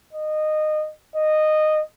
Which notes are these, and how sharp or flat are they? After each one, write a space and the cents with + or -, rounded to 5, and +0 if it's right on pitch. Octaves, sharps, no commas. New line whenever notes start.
D#5 -20
D#5 -15